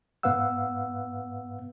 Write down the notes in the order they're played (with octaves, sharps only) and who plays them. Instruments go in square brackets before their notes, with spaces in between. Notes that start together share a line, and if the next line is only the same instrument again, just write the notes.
[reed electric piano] G#2 B3 B4 F5 F#5 E6